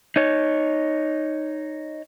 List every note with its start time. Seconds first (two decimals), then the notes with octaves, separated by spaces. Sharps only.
0.16 D#4 C#5